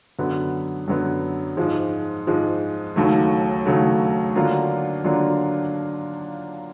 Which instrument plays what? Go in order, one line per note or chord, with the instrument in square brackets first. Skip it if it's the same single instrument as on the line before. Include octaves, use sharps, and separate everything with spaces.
[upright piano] F#2 D3 F#3 B3
F#2 D3 F#3 B3
G#2 F3 G#3
G#2 F3 G#3
D#2 C#3 F#3 A3
D#2 C#3 F#3 A3
D3 F#3 A#3 D4 F4
D3 F#3 A#3 D4 F4